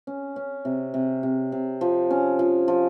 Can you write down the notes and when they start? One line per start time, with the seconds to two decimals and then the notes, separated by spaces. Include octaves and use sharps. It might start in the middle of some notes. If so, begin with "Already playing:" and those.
0.07 C#4
0.36 C#4
0.65 C3
0.94 C3
1.23 C3
1.52 C3
1.81 F3
2.11 C#4
2.39 F3
2.68 F3